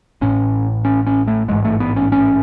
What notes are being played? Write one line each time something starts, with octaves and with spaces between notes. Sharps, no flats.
A1 A2 C#4
C#4
C#4
A3
A1 G#2 G#3
A3
B3
C#4
C#4